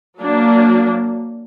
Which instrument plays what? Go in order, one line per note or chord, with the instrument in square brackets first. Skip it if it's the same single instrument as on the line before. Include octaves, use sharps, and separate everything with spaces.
[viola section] F#3 A#3 D4